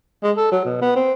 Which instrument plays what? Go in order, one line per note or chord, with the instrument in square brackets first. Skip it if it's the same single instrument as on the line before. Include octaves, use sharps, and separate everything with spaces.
[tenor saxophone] G#3
A4
F#3
B2
B3
C4